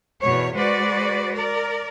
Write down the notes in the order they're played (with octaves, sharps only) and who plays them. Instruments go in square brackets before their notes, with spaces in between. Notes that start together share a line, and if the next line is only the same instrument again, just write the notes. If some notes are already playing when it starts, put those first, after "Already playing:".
[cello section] E2 B2 C#5
G#3 F#4 B4 C5 D5
A#4 D5